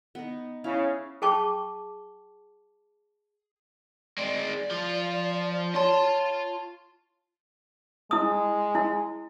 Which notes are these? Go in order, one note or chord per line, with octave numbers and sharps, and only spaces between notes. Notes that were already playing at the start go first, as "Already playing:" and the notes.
B3 D#4
C#3 E4 F5
G#4 G5 A5 C#6 D6
G#3 C4 D5
F3 F4
F4 C#5 A5 C6
G#3 E4 D#6
E4